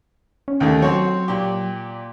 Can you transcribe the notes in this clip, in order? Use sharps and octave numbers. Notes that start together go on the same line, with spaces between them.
C#4
D#2 D#3 A3
F#3 C4 F#4 C#5
A#2 G4